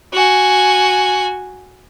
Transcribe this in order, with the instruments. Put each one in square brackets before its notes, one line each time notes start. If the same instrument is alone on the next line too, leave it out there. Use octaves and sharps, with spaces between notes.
[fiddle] F#4 G#5